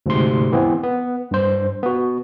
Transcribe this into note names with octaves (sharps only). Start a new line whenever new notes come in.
D2 G#2 C3 C6
E3 B3 C4
B3
G2 C5
B3 F#4